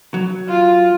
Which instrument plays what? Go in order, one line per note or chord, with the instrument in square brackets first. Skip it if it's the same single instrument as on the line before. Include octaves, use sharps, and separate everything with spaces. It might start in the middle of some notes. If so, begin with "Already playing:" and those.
[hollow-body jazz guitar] F#3
[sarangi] F4